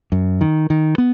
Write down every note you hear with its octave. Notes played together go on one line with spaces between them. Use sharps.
F#2
D#3
D#3
B3